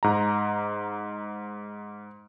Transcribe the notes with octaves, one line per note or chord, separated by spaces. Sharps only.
G#2 A#5